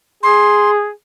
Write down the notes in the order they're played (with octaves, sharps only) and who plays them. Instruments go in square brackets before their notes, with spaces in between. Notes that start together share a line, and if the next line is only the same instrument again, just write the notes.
[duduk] G#4 [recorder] C6